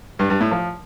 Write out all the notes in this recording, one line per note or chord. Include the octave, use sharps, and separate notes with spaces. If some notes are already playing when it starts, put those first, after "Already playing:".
G2
G2
A2
F3